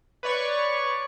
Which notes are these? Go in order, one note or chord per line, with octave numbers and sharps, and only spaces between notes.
B4 C#5 D5 C#6